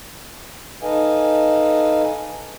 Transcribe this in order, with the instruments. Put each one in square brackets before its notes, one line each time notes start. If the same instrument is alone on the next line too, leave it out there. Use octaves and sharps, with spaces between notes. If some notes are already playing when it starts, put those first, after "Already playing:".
[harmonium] D#4 A4 B4 D#5 F5 G#5